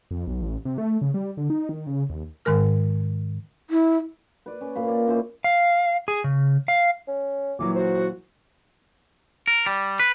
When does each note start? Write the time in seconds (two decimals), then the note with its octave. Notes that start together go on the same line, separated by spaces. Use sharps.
0.11 F2
0.27 B1
0.42 A1
0.65 C3
0.78 A3
1.02 C#3
1.14 G3
1.37 D3
1.50 D#4
1.69 D#3
1.87 C#3
2.10 D#2
2.45 G#2 D#3 G#3 A#4 F6
3.70 E4
4.46 B4 D5
4.61 C#4
4.75 A#2 F5 B5
4.88 D5
5.08 C#4 E4 F4 C5
5.44 F5
6.08 G#4
6.24 C#3
6.68 F5
7.08 C#4
7.59 A#2 E3 F#3 D6
7.75 F#4 C5
9.48 A#4
9.66 G3
10.00 B4